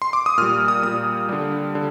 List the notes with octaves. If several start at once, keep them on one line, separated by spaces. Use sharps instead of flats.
C6
D6
D#6
A#2 G3 F6
D#6
A#2 G3 D#6
D3 G3
D3